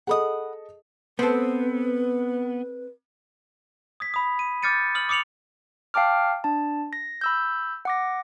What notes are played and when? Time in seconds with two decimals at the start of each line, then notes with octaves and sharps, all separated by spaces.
0.07 G#4 A4 D#5 F#5 B5 D#6
1.19 B3 C4 A4 B4
4.00 D#6 G#6 B6
4.14 B5 D#6
4.39 D#7
4.62 D6 F6 G6 A6 C#7 D#7
4.95 D#6 F6 F#7
5.09 D6 D#6 C#7 F7 F#7
5.94 F5 G5 A5 D6 F6
6.44 D4 A5
6.93 A#6
7.21 B5 E6 G6
7.85 F#5 D6 A#6